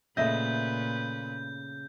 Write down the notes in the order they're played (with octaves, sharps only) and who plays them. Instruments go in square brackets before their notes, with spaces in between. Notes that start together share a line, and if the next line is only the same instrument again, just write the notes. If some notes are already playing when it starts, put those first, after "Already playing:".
[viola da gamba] A#2 B4 [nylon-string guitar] C#3 A3 [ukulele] D#5 E5 [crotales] G6